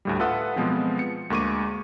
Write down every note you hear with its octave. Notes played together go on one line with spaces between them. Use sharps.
D2 A2 G3
F4 A4 B4 E5 F#5 D#6
B2 F3 F#3 G#3 B3 C4
C#7
D2 G#3 A#3 C#6 D6 D#7